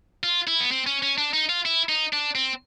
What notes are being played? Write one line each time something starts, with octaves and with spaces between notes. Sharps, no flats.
F4
E4
B3
C4
C#4
C#4
D4
D#4
F4
E4
D#4
D4
C4